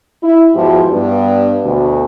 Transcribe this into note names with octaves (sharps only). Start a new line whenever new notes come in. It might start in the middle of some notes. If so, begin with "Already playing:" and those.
E4
E2 G#2 F3 E4 F#4 G4
G2 B3 D4
D2 B2